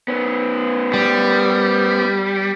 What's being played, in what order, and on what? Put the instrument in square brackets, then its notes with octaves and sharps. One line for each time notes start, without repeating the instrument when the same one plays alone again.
[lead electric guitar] B3 C#4
[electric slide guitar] G3